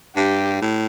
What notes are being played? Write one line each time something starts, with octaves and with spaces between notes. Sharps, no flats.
G2 G4
A2